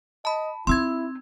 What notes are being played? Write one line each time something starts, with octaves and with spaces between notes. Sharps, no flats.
D#5 A5 B5
C4 D#4 E4 C6 E6 G#6